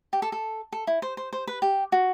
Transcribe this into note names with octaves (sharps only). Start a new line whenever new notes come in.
G4
A4
A4
A4
E4
C5
C5
C5
B4
G4
F#4